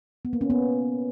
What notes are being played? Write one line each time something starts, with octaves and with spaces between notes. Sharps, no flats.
B3
A#3
C#4
B3